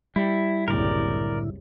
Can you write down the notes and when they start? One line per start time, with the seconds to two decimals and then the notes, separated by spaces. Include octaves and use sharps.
0.16 G3 E4
0.68 F#1 C2 A2 D3 E4 A#4 D5